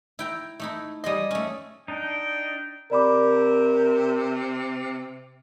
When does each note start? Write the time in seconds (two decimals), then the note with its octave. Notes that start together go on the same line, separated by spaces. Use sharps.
0.19 E4 G5 A#5
0.60 A3 D#4 E4
1.04 G3 G#4 D#5 C6 D#6
1.31 A3 C#4
1.88 D4 D#4 D#5 G5
2.91 C3 A#4 D5 B5 D6